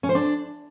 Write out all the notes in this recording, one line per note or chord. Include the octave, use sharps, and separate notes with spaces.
C#4
C5
D4